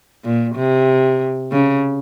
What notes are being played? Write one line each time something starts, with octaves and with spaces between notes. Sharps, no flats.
A#2
C3
C#3